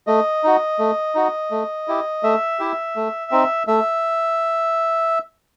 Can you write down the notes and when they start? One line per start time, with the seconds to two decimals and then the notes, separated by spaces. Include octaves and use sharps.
0.07 A3 D#5
0.44 D#4 F#4
0.79 A3
1.15 D#4 F#4
1.51 A3
1.88 E4 G4
2.23 A3 E5
2.59 E4 G4
2.96 A3
3.31 C4 D#4
3.67 A3 E5